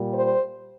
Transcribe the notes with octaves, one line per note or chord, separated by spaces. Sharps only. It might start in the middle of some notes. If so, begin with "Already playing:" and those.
Already playing: A#2 G3
C5